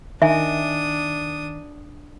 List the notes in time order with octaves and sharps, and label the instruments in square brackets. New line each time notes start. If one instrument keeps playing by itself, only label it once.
[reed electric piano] D#3 [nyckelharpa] D4 D#6 [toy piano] E5 G#5